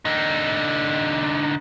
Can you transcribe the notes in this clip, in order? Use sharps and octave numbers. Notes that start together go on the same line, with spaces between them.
D3 D#4